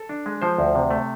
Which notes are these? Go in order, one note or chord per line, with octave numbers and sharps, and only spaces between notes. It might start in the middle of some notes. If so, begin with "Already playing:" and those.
Already playing: A4
D4
G#3
F3 C5
D2
C3
A3